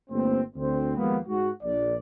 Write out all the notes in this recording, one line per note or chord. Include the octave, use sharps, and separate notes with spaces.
G1 A3 A#3 C4
D2 C4
D#2 F3 G#3 A#3 B3
G#2 F#4
A#1 D5